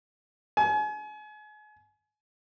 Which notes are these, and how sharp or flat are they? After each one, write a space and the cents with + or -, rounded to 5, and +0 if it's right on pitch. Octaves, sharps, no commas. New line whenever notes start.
G#5 +35